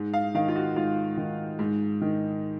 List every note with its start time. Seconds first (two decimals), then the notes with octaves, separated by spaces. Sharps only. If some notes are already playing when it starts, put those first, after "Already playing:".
Already playing: G#2
0.13 F5
0.35 D#3 F5
0.48 F4
0.56 F#4
0.76 G#2 F4
1.17 D#3
1.59 G#2
2.02 D#3